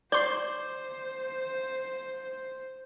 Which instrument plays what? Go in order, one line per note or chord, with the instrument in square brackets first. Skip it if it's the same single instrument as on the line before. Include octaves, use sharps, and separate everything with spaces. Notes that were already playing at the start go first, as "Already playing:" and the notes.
[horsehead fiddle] C5 [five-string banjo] D5 [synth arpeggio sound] C6 G6